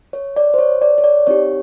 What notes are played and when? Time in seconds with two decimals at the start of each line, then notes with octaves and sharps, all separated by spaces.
0.13 C#5
0.36 D5
0.54 C5
0.59 C#5
0.82 D5
0.98 C#5
1.04 D5
1.27 C4 D#4 G4 C#5